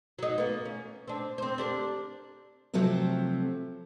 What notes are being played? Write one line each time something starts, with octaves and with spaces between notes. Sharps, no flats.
F#3 D#4
A#3 B3
C#4
C4 D4
C4 C5
D4 G4 A#4
C3 F3 F#3 A3 C4